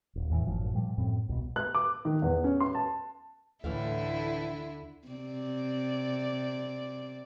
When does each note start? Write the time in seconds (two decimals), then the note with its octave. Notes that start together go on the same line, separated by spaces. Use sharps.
0.16 D#1
0.30 E2 A2 C#3 E3
0.47 G#1 F#2 A2 F3
0.74 A#2 F3 G3
0.98 F#2 A2 C4
1.29 C2 B2
1.56 F#6
1.75 D6
2.05 D#3
2.22 E2
2.44 C#4
2.60 C6
2.75 A5
3.64 D2 A2 D3 E3 E4 F5
5.08 C3 D5